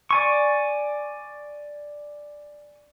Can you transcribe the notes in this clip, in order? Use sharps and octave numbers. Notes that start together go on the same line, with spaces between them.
D5 G#5 C#6